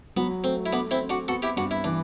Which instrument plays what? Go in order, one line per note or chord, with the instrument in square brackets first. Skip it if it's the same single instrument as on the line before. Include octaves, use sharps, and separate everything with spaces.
[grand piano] F#3 [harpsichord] B3
[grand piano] A3 [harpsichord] C4
[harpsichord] E4
[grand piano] A3 [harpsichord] B3 D4
[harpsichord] C4 E4
[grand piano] C4
[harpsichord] D4 F#4
[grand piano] B3 [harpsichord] F#4 A4
[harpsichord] E4 G4
[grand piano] G2 [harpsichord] D4 F#4
[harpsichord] E4
[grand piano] E3 [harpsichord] D4